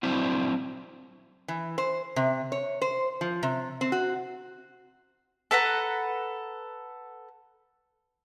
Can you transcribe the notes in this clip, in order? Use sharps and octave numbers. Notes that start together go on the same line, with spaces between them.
F#3 C4 D4 E4
E3
C5
C3
C#5
C5
F3
C3
C4
F#4
A4 B4 F#5 A#5